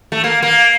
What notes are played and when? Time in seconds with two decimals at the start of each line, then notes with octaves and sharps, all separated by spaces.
0.12 A3
0.24 A#3
0.42 A#3